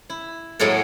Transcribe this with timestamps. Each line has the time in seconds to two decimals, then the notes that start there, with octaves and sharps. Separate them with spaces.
0.10 E4
0.59 A2 F#3 G#3 A#3 A4